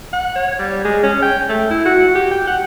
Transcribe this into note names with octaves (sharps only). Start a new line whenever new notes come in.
F#5
C#5
G3
G#3
C#4
G5
A3
E4
F#4
G4
G5
F#5